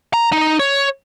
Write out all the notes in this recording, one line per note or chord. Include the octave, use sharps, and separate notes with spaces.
A#5
D#4
C#5